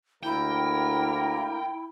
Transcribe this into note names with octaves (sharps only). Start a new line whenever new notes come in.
D2 A#3 E4 A#4 G5